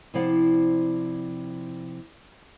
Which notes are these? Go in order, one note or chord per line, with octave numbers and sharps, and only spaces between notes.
C3 F3 E4 D5 F#5